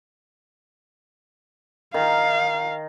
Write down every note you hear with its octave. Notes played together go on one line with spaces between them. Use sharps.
D#3 F5